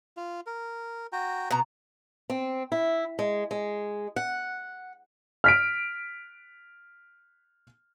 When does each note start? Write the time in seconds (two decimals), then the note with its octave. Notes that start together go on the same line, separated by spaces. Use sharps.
0.17 F4
0.46 A#4
1.13 F#4 G5 A#5
1.51 B2 A#5
2.30 C4
2.72 E4
3.19 G#3
3.51 G#3
4.16 F#5
5.44 F6 B6 D7